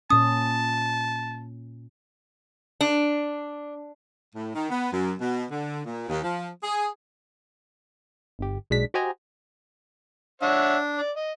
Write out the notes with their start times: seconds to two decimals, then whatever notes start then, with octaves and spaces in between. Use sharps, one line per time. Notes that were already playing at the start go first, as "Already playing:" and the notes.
0.10 A#2 C#4 A5 D#6
2.81 D4
4.35 A2
4.55 D#3
4.70 B3
4.93 F#2
5.20 B2
5.51 D3
5.85 A#2
6.08 D#2
6.24 F3
6.63 G#4
8.39 G1 G4
8.70 B1 G#3 D4 B6
8.94 F#4 G4 C5 D#5 G#5 A#5
10.42 D4 C#5 E5 F#5
10.98 D5
11.16 D#5